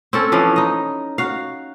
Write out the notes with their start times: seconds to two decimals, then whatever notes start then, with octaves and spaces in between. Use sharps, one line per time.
0.13 C4 C#4 A4
0.32 E3 F3 C#4 D5
0.56 D#4 D#5
1.18 F#4 F5